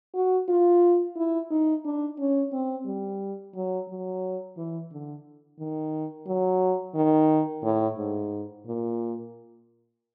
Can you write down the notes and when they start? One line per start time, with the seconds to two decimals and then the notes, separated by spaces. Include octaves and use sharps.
0.14 F#4
0.48 F4
1.16 E4
1.50 D#4
1.85 D4
2.19 C#4
2.52 C4
2.86 G3
3.55 F#3
3.89 F#3
4.57 E3
4.92 D3
5.59 D#3
6.27 F#3
6.95 D#3
7.63 A2
7.97 G#2
8.66 A#2